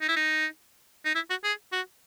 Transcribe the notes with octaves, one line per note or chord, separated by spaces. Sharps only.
D#4
E4
D#4
D#4
E4
F#4
G#4
F#4